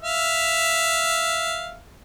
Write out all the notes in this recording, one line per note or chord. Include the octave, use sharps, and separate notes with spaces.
E5 F5